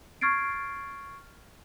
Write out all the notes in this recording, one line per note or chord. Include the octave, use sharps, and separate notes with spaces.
C#6 F6 G#6 A6 C7 D7